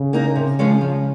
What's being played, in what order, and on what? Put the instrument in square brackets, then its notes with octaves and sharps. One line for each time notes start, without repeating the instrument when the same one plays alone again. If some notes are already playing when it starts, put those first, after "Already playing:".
Already playing: [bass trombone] C#3
[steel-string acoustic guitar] A#3 D#4 A#4
C3
F3 G#3 C#4
F3